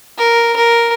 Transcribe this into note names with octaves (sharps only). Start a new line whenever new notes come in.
A#4
A#4